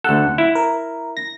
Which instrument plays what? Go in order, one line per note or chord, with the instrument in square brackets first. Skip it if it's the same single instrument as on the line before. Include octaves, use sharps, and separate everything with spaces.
[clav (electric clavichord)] D2 A4 [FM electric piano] F#5
[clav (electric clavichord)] E4
[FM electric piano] A#4
A#6